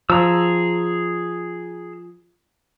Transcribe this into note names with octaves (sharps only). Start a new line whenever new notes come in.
F3 G#4 A#5 E6